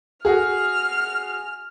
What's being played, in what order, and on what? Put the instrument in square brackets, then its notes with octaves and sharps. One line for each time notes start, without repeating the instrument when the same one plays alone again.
[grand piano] F#4 G#4 [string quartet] F6